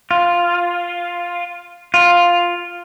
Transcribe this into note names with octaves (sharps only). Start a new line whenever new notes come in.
F4
F4